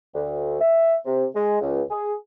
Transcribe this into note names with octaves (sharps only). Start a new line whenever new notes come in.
D2
E5
C3
G#3
C#2
G#4